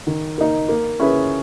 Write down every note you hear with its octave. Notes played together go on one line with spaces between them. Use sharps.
D#3
A#3 D#4
A#3
C#4 E4 G#4 B4